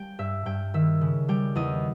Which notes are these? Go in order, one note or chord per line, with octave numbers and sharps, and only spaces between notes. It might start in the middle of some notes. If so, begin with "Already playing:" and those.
Already playing: G3 G5
G2 E5
G2 G5
D#3 E5
C#3
G3 G5
E2 D#5